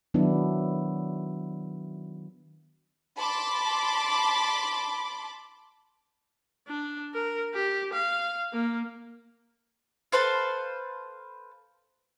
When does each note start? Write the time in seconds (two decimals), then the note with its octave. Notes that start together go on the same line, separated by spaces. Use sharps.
0.14 D#3 F#3 B3 D4 E4
3.17 A5 B5 C6 D6
6.68 D4
7.14 A#4
7.54 G4
7.93 F5
8.53 A#3
10.12 A4 B4 C5 F5